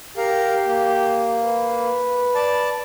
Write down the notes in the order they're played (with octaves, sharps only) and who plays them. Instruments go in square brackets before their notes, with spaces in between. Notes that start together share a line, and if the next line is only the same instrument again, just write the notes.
[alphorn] G4 [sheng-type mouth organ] A#4 F5
[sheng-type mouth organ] A#3
[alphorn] B4
[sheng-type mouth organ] D5 A5